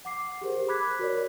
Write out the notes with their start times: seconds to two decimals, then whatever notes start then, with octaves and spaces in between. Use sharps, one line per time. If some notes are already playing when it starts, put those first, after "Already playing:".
0.05 F#5 D6 C7
0.41 G4 G#4 A#4 C5
0.68 B5 D6 F#6 G#6 B6
0.99 F#4 A#4 C#5 D5